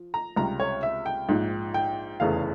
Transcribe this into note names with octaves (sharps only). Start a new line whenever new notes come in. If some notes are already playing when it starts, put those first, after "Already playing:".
Already playing: F3
A#5
C#2 C3 G3 A#5
C#5
E5
G5
A#1 G#2 F3
G5
F1 E2 C#3 E3 F5